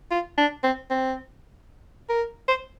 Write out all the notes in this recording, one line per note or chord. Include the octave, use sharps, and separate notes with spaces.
F4
D4
C4
C4
A#4
C5